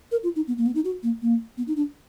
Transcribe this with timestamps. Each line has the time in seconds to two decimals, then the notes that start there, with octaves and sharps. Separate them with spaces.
0.12 A#4
0.23 F4
0.36 D#4
0.48 B3
0.58 A#3
0.66 B3
0.75 D#4
0.85 F#4
1.03 A#3
1.22 A#3
1.58 B3
1.68 D#4
1.77 D4